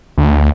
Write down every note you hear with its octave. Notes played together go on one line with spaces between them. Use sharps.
D2